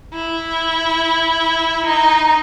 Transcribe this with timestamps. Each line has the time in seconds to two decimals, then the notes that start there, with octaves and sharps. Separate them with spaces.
0.12 E4
1.86 D#4